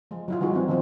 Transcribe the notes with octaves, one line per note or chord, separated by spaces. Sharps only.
F3 G#3
F#3 E4 F4
D#3 E3 G3 D#4 F#4 G#4
F3 G#3 C4
D#3 F3 C4